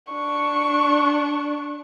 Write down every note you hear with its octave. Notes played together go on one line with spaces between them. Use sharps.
D4 C#6